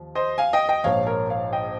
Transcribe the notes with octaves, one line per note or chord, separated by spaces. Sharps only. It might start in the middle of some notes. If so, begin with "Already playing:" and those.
Already playing: D#2 F3
C5 D#5
F5 G#5
D#5 G5
D#5 G5
A#1 G#2 F3 C#5 F5
A#4 C#5
C#5 F5
D#5 G5